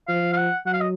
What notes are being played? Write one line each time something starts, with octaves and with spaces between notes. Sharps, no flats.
F3 F5
F5
F#5
F#3 F#5
F5
D#5